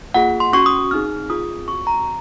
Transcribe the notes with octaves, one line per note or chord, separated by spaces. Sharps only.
A#3 F4 G#4 F#5
C6
C#4 F#4 C#6
D#6
C4 D#4 G#4 F6
C4 F4 G#4 D#6
C4 F#4 C#6
A#5